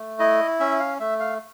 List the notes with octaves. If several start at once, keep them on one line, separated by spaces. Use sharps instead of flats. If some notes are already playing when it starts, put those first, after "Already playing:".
Already playing: A3
E4 D#5
C#4 E5
F5
A3 E5
F5